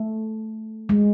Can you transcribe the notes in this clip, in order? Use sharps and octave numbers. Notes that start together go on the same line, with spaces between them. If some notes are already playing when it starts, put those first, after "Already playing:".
Already playing: A3
G#3